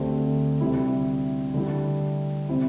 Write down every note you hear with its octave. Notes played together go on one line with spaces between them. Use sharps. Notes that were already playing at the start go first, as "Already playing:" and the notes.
Already playing: D2 D3 A3 C4 G4
D2 C3 G3 E4
D3 G3 E4 G4
C3 G3 C4 E4